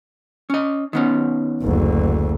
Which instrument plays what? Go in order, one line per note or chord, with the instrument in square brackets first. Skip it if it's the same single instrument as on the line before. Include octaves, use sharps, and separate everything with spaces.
[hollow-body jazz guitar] C#4 D#5
D#3 B3 C#4
[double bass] F#1 D2